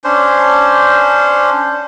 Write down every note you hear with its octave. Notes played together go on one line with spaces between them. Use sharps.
C#4 D4 C5